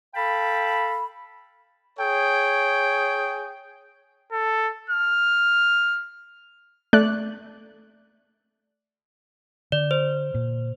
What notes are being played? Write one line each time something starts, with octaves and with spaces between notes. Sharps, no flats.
A4 F5 G5 A5 B5
G#4 C#5 G5
A4
F6
A3 D5 F#6
D3 D5
C5
A#2